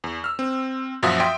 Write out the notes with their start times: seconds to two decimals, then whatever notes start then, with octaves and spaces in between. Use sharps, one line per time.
0.04 E2
0.24 E6 F6
0.39 C4
1.03 F#2 A#2 F3 F#4 E5 D#6
1.20 E5 G5 C6